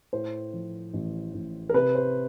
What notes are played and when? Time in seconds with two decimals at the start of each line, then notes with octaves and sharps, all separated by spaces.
0.13 A2 C5
0.53 F3
0.93 A1
1.34 A1
1.69 A#4
1.74 C3 B4
1.95 C5